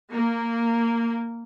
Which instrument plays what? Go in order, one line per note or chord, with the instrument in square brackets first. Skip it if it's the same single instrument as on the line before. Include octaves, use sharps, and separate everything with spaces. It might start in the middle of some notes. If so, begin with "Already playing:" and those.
[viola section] A#3